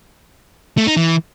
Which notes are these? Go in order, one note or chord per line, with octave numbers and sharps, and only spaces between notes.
A3
D#4
E3